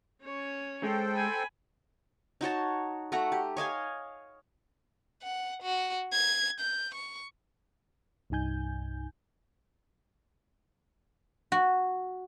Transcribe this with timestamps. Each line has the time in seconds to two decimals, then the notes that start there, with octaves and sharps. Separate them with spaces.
0.24 C#4 C#5
0.83 G#3 A4 C5 G5
1.14 G#5 B5
2.41 D#4 F#4 C#5 A5
3.12 A3 F#4 F#5 A#5
3.32 G4
3.57 C#5 D#5 F5 G#5
5.23 F#5
5.63 F#4
6.13 G#6
6.60 G6
6.95 C#6
8.30 C2 G2 D#4 G#5 G6
11.52 F#4